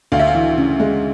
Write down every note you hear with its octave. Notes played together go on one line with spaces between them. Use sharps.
D2 F5
E5
F5
E3
C#3
G#3